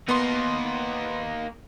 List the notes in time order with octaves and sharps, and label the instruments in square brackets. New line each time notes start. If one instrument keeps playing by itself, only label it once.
[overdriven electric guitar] A#3 D#4 [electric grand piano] B3 C6